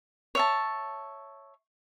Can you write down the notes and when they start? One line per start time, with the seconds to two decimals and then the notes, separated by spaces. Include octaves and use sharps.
0.35 C#5 E5 A5